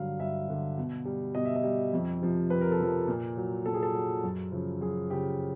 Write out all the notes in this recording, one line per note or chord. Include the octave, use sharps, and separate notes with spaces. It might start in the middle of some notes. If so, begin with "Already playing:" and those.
Already playing: G2 D3 F#3 F5
G2 E5
D3 F#3
B2
G3
B2 D#5
E5
D#5
G3
F2
C3 F3
F2 B4
A#4
A4
C3 F3 A#4
A#2
F#3
A#2 A4
G#4
A4
F#3
F#2
C#3 F3
F#2 G#4
C#3 F3 G4